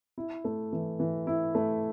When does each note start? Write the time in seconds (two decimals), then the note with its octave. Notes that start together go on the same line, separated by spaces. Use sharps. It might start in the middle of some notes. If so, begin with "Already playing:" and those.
0.18 E4
0.45 A3
0.73 E3
1.00 E3
1.27 E4
1.55 A3